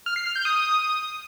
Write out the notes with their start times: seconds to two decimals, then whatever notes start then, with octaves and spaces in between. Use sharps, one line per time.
0.06 F6
0.16 C7
0.26 F6
0.36 G6
0.45 D#6